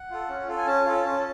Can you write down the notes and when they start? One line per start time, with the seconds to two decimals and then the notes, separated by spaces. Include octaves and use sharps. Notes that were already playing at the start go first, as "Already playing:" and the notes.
Already playing: F#5
0.11 F4 A4
0.29 C#4
0.48 F4 A4
0.57 G#5
0.66 C#4 A5
0.85 F4 A4
1.05 C#4